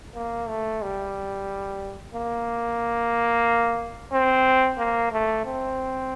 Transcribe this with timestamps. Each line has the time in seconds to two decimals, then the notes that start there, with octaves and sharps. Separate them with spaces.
0.15 A#3
0.48 A3
0.82 G3
2.14 A#3
4.12 C4
4.78 A#3
5.12 A3
5.45 C4